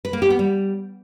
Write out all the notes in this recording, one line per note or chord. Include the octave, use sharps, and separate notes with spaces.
B4
A#3
G4
B3
G3